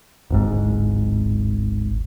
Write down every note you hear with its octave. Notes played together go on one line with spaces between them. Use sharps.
D1 G#1 G#2